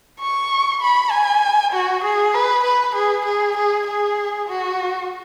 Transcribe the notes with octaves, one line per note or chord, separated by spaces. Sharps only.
C#6
B5
G#5
F#4
G#4
B4
B4
G#4
G#4
G#4
G#4
F#4